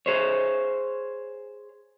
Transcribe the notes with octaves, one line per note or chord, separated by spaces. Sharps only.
G#4 C5 C#5